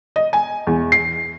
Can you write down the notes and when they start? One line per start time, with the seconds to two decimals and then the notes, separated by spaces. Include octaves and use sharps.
0.16 D#5
0.33 G#5
0.67 E2
0.92 C7